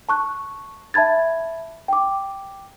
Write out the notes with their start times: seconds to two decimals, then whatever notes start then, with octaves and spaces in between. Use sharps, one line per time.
0.09 A5 C#6 F#6
0.94 E5 A5 B5 G#6 A6
1.88 G5 D6